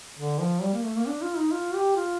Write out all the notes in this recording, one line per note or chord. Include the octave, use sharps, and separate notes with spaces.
D3
F3
G3
A#3
A3
A#3
D4
F4
D#4
F4
G4
F4